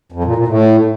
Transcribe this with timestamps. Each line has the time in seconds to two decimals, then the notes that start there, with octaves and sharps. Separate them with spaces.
0.12 F2
0.24 A#2
0.36 A#2
0.47 A2